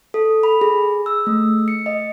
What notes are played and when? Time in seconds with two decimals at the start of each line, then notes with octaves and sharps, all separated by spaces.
0.14 A4
0.43 B5
0.61 G#4
1.06 E6
1.27 A3
1.68 C#7
1.86 D#5